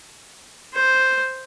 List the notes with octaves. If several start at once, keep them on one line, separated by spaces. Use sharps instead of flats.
C5